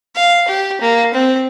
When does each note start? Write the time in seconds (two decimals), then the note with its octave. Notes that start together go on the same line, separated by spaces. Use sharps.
0.16 F5
0.48 G4
0.81 A#3
1.14 C4